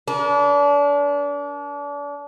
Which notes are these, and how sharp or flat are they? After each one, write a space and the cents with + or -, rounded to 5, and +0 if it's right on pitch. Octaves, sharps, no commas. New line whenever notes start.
D4 -35 A#4 +40